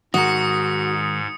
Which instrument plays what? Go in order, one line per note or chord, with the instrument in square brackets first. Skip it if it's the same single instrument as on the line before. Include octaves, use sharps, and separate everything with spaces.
[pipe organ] G#2 [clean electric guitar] D#3 G#3 A#4 [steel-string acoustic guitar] F#4 [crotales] D#6 C#7